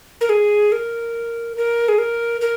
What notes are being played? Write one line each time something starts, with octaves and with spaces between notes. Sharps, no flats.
A#4
G#4
A#4
A#4
G#4
A#4
A#4